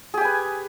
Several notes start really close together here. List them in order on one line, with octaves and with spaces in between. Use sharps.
G#4 G4 G#5 B4